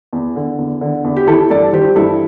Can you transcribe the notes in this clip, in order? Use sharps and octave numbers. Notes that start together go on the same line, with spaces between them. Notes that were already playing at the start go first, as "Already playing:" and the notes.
E2
D3
E2
D3
E2
G4
E3 E4 A4
G2 A4 D5
E3 G4 C5
G2 E4 A4